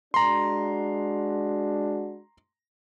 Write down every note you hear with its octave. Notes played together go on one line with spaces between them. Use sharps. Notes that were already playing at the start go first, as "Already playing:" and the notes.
G#3 D4 F#4 A#5 C6